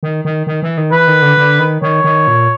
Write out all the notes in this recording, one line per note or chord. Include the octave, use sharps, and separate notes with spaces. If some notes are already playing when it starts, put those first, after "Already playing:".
D#3
D#3
D#3
E3
D#3
E3 B4
D#3
D3
D3
D#3
D#3 C#5
D#3
A#2